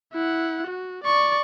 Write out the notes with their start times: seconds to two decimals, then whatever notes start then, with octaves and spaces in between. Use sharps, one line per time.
0.13 E4 F#5
0.67 F#4
1.04 D5 C#6